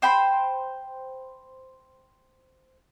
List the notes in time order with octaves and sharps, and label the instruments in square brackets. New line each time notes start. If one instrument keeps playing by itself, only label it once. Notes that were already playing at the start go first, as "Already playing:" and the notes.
[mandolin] C5 G5 B5